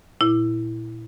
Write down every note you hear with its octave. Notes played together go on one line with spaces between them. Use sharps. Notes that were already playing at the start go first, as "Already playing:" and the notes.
A#2 E4